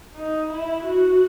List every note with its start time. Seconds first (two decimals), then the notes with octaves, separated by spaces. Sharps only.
0.15 D#4
0.50 E4
0.84 F#4